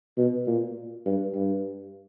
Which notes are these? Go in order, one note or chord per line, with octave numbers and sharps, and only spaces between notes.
B2
A#2
G2
G2